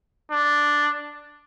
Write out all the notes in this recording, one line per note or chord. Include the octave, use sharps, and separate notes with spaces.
D4